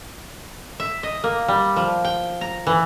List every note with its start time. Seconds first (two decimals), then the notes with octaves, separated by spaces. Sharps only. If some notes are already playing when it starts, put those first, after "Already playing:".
0.80 E5
1.03 D#5
1.24 A#3
1.48 G3
1.76 F3
2.04 G5
2.41 A#5
2.67 E3